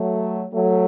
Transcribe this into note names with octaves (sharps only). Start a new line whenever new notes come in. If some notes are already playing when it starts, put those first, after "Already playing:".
Already playing: F#3 A3
F#3 A3